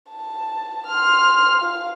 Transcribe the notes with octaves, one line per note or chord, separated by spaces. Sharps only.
A5
C6 F6
F4 F5